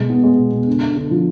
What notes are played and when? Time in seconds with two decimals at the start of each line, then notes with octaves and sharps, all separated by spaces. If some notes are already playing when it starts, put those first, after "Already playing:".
Already playing: B2 G#3
0.10 B3
0.24 G#3
0.38 B2
0.52 B2
0.67 D3
0.81 D3
0.97 D3
1.11 F3